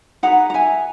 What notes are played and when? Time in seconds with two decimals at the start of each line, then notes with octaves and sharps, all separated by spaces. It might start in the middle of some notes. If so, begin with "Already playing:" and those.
0.23 D#4 G#4 B4 F#5 A#5
0.50 A#5
0.54 E5 G#5